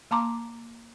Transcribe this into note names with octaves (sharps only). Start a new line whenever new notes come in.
A#3 A5 A#5 C6 D6